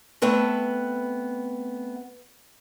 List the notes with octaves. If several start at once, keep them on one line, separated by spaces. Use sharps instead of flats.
A3 B3 C4 B4 A5